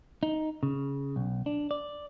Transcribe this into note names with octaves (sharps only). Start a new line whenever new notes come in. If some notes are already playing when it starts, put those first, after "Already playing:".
D#4
C#3
B1
D4
D5